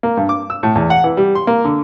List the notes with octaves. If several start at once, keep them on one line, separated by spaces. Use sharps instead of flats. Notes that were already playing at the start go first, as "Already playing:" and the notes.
A#3
G2
D6
E6
A2
E2
F#5
E3
G3
C6
A#3
D3